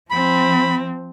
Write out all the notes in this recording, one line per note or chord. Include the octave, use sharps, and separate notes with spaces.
F3 C4 B5